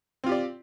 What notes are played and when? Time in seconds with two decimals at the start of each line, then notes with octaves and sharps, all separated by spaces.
0.24 C4
0.26 F4
0.29 G4
0.32 D5